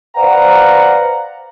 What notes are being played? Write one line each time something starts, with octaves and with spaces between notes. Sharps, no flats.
B4 C5 D5 F5 F#5 A#5